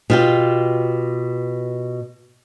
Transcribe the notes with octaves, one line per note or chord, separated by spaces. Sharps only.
B2 F4 G4